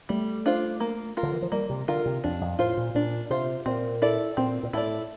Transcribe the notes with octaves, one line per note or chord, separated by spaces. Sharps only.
G3 A3
D4 F4 C5
A#3
F4 A#4
D3
E3
F3
G3 A#3
C3
D3 F4 A#4
C3
F2 D4
F2
A2 F4 C5
A#2
A#2 D4
C3 F4 C5
A#2 C4
E4 A4 D5
A#2 C4
A#2
A2 E4 A4 D5